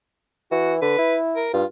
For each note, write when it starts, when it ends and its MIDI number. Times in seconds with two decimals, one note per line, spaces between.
0.51 0.81 52
0.51 0.74 66
0.82 0.98 50
0.82 1.16 71
0.98 1.47 64
1.36 1.51 70
1.54 1.64 43
1.54 1.65 65